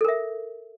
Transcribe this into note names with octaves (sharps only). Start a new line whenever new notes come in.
A4 A#4 E5